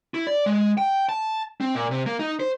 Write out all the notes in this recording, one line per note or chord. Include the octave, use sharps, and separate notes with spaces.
E4
D5
G#3
G5
A5
C4
A#2
C3
A#3
D#4
C5